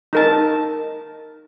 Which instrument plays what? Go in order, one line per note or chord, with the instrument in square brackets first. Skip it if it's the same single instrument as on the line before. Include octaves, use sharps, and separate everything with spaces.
[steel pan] D#4 A#4 A5